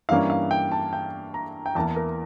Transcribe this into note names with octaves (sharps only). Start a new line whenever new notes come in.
G2 E3 G3 A#3 C#4 F5
F5
G5
A5
G5
A#5
G5
E2 E3 A#3 A5
A#4